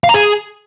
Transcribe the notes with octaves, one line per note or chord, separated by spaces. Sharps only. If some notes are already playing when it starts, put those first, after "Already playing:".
F5
A#5
G#4